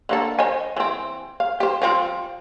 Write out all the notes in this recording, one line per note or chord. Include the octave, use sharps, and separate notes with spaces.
D3 A#3 A4
C5 D#5 G#5
E3 C4
F5
G4 C5
F3 C4 F4